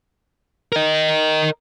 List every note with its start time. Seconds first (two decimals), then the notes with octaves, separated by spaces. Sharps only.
0.73 A#4 D#5